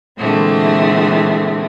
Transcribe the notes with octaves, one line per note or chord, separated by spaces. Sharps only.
A#2 D3 E3 G#3 A3 C4